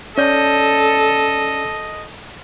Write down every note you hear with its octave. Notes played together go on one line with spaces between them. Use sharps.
C#4 A4 D5 D#5 G6